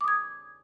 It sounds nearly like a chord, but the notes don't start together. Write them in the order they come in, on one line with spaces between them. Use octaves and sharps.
D6 D#6 G#6